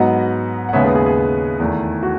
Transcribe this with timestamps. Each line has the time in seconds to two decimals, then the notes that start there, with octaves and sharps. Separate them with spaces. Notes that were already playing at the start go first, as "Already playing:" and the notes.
Already playing: G#2 F#3 B3 D#5 F#5
0.69 F#5
0.73 D#2 C#3 G#3 B3 C#5 E5
0.84 G#4 B4
0.95 G#4
1.06 G#4
1.60 E2 D#3 A3
2.03 F#4